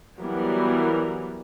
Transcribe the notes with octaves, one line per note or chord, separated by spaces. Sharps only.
E3 F#3 G3 B3 A#4